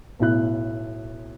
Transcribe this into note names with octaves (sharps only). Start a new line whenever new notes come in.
B1 A2 E4 F#6